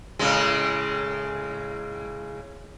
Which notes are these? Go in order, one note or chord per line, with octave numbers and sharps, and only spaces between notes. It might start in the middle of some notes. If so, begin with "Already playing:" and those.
A2 C#3 G#3